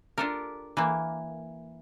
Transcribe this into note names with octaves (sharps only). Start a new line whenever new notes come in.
D4 F4 G4 A4 A#4
E3 A#3